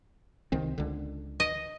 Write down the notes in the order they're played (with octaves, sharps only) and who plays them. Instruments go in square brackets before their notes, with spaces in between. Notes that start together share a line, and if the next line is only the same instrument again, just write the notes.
[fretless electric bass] C2 D#3 C4
C#2 D3
[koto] D#5